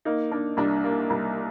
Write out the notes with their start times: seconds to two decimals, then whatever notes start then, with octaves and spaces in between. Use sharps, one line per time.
0.05 A#3 D#4
0.31 A#3 D4
0.57 C2 D4
0.84 A#3
1.10 C2